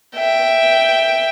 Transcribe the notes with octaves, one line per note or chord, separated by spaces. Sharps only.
E5 G5